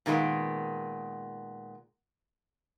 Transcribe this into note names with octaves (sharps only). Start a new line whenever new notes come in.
A#2 D#3 G#3 A3 B3